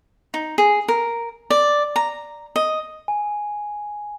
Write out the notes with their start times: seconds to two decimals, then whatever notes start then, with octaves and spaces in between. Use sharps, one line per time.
0.34 D#4
0.58 G#4
0.88 A#4
1.50 D5
1.96 A#5
2.56 D#5
3.08 G#5